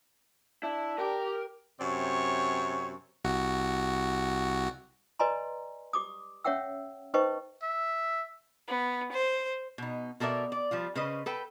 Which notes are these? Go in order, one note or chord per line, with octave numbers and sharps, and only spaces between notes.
D4 E4
G4 A#4
F#2 C3 C4 C#5
C2 F#4
B4 D5 D#5 G#5 A#5 C6
G4 D6 D#6
C#4 C#5 E5 F#5 G5 E6
D#4 B4 C5 D#5 G5 C#6
E5
B3
C5
B2 D#4
B2 A4 A#4 D5 E5
D5
F3 G3 F4
C#3 C#4 B4 C5 D#5
A4 B4 G5